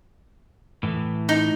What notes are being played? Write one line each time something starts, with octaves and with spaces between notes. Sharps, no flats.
A2 E3
D#4